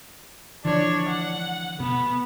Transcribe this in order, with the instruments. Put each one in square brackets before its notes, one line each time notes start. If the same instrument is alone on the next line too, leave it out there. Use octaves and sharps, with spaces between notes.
[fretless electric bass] D3 E3 F3 [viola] D4 C#5
[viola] F#5
[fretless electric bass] B2 [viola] B3